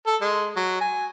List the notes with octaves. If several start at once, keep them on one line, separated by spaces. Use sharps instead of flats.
A4
G#3
F#3
G#5